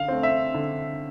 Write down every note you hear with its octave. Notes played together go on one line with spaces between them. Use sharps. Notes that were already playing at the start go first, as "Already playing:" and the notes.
Already playing: D3 F5
A3 C4
E5
D3